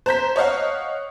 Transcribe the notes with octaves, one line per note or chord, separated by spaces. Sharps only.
C5 A#5 G6 B6
C#5 D#5 F5 F#5